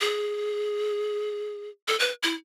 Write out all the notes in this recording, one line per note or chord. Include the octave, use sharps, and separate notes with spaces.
G#4
A4
B4
E4